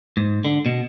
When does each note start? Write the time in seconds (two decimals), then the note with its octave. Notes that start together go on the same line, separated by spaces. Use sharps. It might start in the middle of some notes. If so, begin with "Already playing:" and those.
0.17 G#2
0.45 D3
0.66 B2